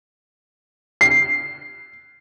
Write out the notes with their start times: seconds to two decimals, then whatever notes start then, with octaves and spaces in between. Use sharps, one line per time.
1.01 C7